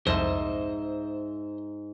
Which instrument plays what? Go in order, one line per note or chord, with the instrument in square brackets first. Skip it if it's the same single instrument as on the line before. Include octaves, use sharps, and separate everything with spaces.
[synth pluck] C2 F2 [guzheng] G#2 [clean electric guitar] C5 D#5 E5